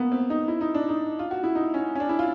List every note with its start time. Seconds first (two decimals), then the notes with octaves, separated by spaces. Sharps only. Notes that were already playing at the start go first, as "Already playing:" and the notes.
Already playing: A#3 B3
0.12 C4
0.30 D#4
0.48 E4
0.61 D#4
0.75 D4
0.89 D#4
1.19 F4
1.31 F#4
1.43 E4
1.55 D#4
1.74 C#4
1.95 C#4
2.00 D4
2.09 E4
2.19 F4